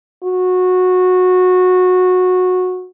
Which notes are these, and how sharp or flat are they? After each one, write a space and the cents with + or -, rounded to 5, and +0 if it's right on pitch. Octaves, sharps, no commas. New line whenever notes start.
F#4 -15